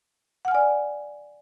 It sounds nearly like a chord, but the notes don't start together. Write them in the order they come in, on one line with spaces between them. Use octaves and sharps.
F#5 F6 G#5 D5